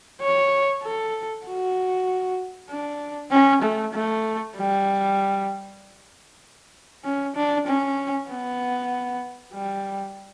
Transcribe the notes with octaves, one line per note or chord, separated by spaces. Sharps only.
C#5
A4
F#4
D4
C#4
A3
A3
G3
C#4
D4
C#4
B3
G3